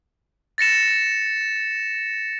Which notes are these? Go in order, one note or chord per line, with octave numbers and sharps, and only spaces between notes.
A6 A#6 C#7 E7